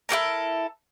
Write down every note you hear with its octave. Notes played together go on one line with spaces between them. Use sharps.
E4 F#4 A4 A#4